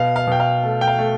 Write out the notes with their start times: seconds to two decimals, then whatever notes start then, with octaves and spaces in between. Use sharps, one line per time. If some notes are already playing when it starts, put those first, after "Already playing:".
Already playing: B2 F5
0.16 F5
0.27 B2 G5
0.40 F5
0.63 A3
0.81 G5
0.87 F5
0.98 A3